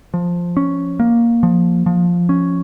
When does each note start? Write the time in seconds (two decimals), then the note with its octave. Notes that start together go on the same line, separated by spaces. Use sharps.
0.14 F3
0.57 C#4
1.00 A#3
1.43 F3
1.86 F3
2.29 C#4